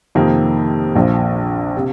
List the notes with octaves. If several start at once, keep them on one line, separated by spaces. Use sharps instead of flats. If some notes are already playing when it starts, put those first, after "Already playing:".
F2 C3 D#3 A#3
A#1 A#2 F3
C3